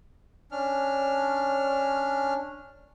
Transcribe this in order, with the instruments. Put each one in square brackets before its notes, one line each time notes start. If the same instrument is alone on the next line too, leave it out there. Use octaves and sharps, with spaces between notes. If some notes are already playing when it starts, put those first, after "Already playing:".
[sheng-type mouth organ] C#4 D4 F6